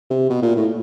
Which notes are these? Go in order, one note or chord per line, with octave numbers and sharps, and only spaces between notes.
C3
B2
A#2
A2